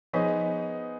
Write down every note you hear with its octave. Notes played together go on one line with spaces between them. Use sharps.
F3 B3 D#4 G#4 C5 D#5